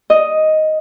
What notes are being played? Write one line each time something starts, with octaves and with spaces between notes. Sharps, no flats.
D#5